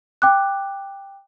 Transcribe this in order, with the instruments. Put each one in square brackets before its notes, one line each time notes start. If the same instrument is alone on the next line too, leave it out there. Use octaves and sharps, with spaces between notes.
[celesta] G5 D6 F#6